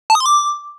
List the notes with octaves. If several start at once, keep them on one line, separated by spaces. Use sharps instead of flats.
A5
D#6
C6
D6